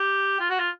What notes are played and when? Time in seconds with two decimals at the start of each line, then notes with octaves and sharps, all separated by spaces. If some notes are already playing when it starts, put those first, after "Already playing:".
Already playing: G4
0.40 F4
0.50 F#4
0.59 F4